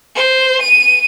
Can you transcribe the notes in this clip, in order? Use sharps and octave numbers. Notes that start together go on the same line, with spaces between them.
C5
D#7